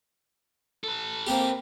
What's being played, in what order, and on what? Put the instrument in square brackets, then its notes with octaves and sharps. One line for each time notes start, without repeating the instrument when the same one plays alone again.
[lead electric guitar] A4 B4
[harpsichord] A#3 C4 G4